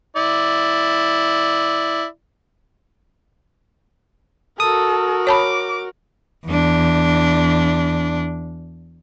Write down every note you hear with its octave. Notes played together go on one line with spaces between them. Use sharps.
E4 D5
F#4 A4 A#4 D#6
C#5 A5 B5 D6
E2 D4